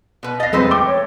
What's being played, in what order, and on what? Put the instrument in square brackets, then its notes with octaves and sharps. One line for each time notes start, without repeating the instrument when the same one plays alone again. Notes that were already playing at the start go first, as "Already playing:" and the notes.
[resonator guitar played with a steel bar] B2 B4
[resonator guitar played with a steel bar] D#5 F5 [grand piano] A6 A#6
[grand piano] F2 G#3 C4 [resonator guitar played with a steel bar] A4 B4 C5
[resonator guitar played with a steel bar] A3 [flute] G5 [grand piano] D6 G7
[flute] C#5